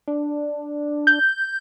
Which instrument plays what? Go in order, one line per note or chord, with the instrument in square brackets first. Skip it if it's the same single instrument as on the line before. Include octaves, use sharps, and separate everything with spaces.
[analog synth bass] D4
[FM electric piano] G6